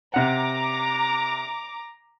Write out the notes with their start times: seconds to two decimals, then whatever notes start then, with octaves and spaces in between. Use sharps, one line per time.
0.14 C3 F#5 A#5 D6